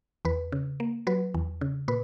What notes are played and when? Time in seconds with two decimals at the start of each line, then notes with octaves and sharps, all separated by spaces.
0.25 E2 B4
0.52 C#3
0.80 A#3
1.07 F#3 B4
1.34 E2
1.61 C#3
1.88 A#2 B4